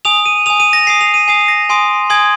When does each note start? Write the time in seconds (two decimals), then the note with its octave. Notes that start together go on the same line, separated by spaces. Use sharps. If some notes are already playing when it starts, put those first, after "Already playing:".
0.05 G#5 D#6 F7
0.26 D#7
0.46 G#5 D#6 F7
0.60 D#7
0.73 A#6
0.87 G#5 D#6 C7
1.01 F7
1.14 D#7
1.28 G#5 D#6 C7
1.48 A#6
1.69 G#5 C6 D#6
2.10 G#5 C6 D#6 G#6